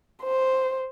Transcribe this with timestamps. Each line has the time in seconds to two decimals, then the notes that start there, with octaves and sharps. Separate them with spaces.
0.23 C5